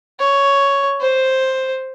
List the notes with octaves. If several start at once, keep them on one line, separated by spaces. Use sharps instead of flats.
C#5
C5